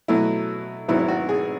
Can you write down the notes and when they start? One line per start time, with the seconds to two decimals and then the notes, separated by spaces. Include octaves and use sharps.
0.08 B2 F#3 A3 E4
0.88 G#1 G#2 F#3 B3 E4
0.99 E4
1.08 F#4
1.29 G#4